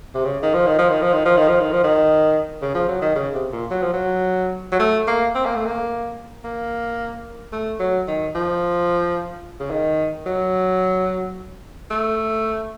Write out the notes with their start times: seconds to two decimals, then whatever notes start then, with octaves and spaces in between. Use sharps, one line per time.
0.15 C3
0.25 C#3
0.43 D#3
0.54 F3
0.67 D#3
0.78 F3
0.90 D#3
1.02 F3
1.13 D#3
1.25 F3
1.37 D#3
1.48 F3
1.60 D#3
1.72 F3
1.84 D#3
2.62 C#3
2.75 F3
2.88 F#3
3.02 D#3
3.15 C#3
3.34 C3
3.53 A#2
3.71 F#3
3.83 F3
3.93 F#3
4.72 F#3
4.79 A3
5.07 A#3
5.35 C4
5.45 A#3
5.55 A3
5.66 A#3
6.44 A#3
7.52 A3
7.80 F#3
8.08 D#3
8.35 F3
9.60 C#3
9.71 D#3
10.26 F#3
11.90 A3